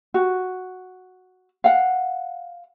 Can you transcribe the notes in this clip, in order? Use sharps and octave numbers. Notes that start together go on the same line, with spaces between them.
F#4
F5 F#5